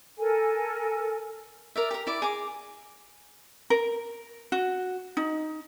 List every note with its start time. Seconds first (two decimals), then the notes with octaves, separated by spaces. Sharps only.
0.18 A4 A#4 G#5
1.76 A#4 D5 E5
1.91 G4 A#4
2.07 E4 D5
2.22 G#4 A#5 D6
3.70 A#4
4.52 F#4
5.17 D#4